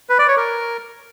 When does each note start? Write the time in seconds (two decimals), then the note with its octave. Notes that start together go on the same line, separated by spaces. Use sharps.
0.09 B4
0.19 D5
0.28 C#5
0.37 A#4